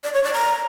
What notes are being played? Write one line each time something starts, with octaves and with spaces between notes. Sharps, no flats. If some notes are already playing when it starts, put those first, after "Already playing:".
D5
C#5
D5
A#5